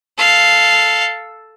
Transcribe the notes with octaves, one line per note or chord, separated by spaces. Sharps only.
A4 F5